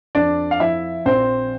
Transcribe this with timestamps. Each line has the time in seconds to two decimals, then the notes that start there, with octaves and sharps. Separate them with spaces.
0.15 F2 D4 D5
0.51 F5
0.60 F3 E4 E5
1.06 A#1 C4 C5